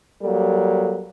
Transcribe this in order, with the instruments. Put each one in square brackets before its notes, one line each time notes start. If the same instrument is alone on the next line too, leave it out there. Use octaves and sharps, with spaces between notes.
[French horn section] F#3 G3 A#3 A4